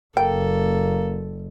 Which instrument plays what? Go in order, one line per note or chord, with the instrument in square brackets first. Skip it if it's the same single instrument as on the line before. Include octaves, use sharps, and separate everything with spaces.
[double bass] F#1 [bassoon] A#3 [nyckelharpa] A4 [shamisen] G5